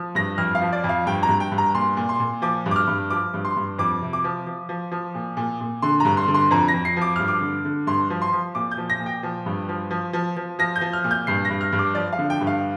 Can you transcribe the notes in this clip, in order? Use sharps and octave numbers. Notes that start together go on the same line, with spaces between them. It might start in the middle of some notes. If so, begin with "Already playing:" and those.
Already playing: F3
G2 A#6
F2 F6
F5
F3
D5
F2
F5
G2 G5
A#5
G2
G5
G2
A#5
A#2 C6
A#2
C6
A#2
F3 D6
G2
D6
F6
G2
F3 D6
G2
C6
G2
F2 D6
C3
D6
F3
F3
F3
F3
A#2
A#2
A#2
D3 C6
G2 A#5
C6
D3
C6
F2 A#5
A#6
F2
C7
F3
D6
G2 F6
D6
D3
D3
G2 C6
F3
C6
F3
A#2 D6
G6
F3
A#6
A#2
G5
F3
G2
F3
F3
F3
F3
F3 A#6
G6
F3
F6
A#2
G6
G2 C7
A#6
G2
F6
G2
D6
F3 D5
F5
D3
G5
G2
F5